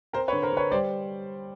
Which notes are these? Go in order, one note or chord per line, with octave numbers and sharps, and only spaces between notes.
C4 A#4 C5
B4 C#5
D3
A#4 C5
D3 B4 C#5
G3 C5 D5